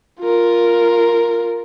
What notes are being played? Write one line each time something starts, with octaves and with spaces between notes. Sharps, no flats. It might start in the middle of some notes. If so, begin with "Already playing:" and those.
F4 A#4